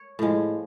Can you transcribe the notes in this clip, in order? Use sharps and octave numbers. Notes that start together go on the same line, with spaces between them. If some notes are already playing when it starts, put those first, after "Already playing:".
Already playing: C#5
A2 F3 G#3